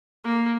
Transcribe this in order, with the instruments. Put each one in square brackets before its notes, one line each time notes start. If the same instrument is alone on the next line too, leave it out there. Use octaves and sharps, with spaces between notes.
[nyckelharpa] A#3